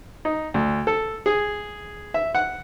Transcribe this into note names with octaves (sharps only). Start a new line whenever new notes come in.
D#4
D2
A4
G#4
E5
F#5